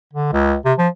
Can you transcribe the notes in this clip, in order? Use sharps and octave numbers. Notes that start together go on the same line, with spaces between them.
D3
C#2
C3
F3